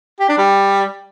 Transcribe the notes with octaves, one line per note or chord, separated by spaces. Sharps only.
G4
D4
G3